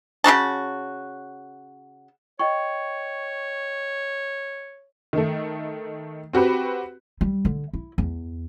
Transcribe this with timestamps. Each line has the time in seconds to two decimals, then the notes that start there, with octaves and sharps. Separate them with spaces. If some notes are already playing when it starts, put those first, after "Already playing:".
0.24 C#3 D#4 F#4 A5
2.39 C#5 D#5 G5 C#6
5.13 D#3 A3
6.33 C4 F#4 G4 B4
7.21 G3
7.45 D3
7.73 E4
7.98 E2